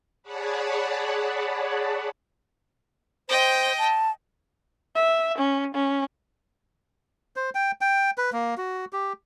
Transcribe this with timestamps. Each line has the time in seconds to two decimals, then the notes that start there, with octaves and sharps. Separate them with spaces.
0.23 G#4 C#5 D5 F#5 A5 B5
3.29 C5 D#5 G5
3.78 A5
4.95 E5
5.38 C#4
5.74 C#4
7.36 C5
7.55 G5
7.81 G5
8.18 B4
8.33 A#3
8.58 F#4
8.93 G4